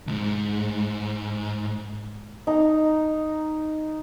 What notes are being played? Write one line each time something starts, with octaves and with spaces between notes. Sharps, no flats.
C#2 G#2
D#4 A#5